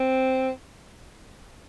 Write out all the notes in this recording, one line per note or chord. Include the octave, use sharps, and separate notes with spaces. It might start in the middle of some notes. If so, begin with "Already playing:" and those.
Already playing: C4